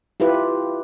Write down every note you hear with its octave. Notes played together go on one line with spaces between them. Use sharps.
E4 F4 G4 B4